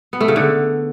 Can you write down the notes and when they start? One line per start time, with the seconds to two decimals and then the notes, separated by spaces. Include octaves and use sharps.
0.13 B3
0.21 A3
0.28 C#3
0.36 D3